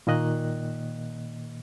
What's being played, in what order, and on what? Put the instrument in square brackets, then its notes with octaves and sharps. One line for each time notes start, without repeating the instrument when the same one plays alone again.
[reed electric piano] A#2 D#3 A#3 D#5 F#6